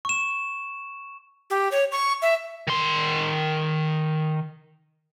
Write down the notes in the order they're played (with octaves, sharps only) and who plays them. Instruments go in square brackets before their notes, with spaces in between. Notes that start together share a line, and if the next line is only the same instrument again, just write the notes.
[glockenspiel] C#6 E7
[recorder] G4
C#5
C#6
E5
[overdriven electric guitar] D#3 C6